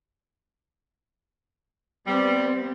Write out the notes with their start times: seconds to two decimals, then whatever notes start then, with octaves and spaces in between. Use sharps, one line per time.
2.07 G3 B3 C4